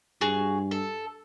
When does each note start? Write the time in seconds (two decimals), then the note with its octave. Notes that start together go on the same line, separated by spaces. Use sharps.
0.21 G2 F#4 G#4
0.71 A4